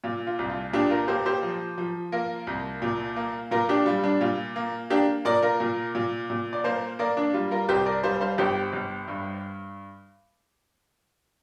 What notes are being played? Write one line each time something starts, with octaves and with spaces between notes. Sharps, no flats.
A#2 F4
F4
C2
F4
A#2 D4 G4
F4 A#4
A#3 G4 C5
G4 C5
F3
F3
A#3 F4 A#4
C2
A#2
A#3
A#2 F4 A#4
D4 G4
G3 F4
D4
A#2 F4
A#3
A#3 D4 G4
A#2 A#4 D5
F4 A#4
A#2
A#2
A#2
D5
A#3 C5 F5
A#3 A#4 D5
D4
G3 F4
F4 A#4
C2 G4 C5
A#4 D5
G3 C5 F5
C5 F5
G1 G4 C5
G1
G2